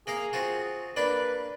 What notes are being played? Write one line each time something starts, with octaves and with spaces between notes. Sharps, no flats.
A#3 G#4 A#4 F5
C4 F4 F#4
A#3 D4 B4 D5